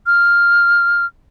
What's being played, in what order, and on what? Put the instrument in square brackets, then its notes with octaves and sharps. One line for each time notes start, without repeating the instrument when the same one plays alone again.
[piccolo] F6